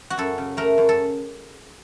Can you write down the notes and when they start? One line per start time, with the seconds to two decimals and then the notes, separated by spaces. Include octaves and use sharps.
0.10 F#4
0.18 F#2 A4
0.38 C#3
0.57 A3 A#4
0.78 F#2
0.89 A4